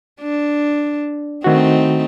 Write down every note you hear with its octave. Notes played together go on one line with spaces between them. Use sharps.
D4
D#3 A3 C4 D#4 F#4